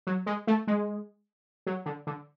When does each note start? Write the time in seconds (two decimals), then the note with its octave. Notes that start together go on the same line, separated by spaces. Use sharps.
0.07 F#3
0.26 G#3
0.47 A3
0.67 G#3
1.66 F#3
1.86 D3
2.07 D3